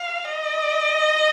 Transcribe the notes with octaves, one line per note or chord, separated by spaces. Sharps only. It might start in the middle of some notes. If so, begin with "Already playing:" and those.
Already playing: F5
D#5